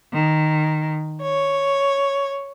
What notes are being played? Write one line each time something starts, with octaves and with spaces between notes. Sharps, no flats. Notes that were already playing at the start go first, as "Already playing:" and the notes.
D#3
C#5